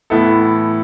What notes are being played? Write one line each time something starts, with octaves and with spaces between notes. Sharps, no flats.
A2 E3 B3 E4 A4